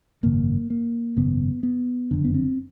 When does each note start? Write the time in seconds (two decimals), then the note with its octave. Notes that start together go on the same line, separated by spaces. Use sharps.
0.23 G#1 F#2 C#3 A#3
0.70 A#3
1.16 G#1 F#2 C#3 B3
1.63 B3
2.11 F#1 F2 D3
2.25 B3
2.34 C4